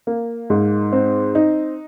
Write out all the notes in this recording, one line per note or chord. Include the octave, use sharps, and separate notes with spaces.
A#3
G#2
C4
D#4